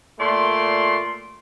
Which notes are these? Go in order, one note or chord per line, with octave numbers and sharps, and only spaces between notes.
A#2 A3 D5 C6